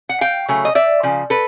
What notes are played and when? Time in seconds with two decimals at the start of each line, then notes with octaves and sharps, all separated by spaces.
0.09 F#5
0.21 F5 G5
0.48 C#3 F#3 A3
0.65 D#5
0.75 D5 E5
1.03 C#3 F3
1.30 A4 B4